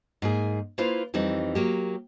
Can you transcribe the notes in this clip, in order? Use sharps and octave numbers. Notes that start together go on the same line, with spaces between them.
G#2 A#3 G#4
A#3 E4 F4 B4 C5 F5
F2 E3 G3 C4 D#4
F#3 A#3 G4